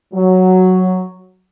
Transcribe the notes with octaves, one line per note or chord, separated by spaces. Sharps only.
F#3